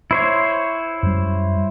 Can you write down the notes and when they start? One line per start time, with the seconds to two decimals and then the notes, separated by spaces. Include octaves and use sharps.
0.11 E4 C5 C#5
1.03 F#2 G3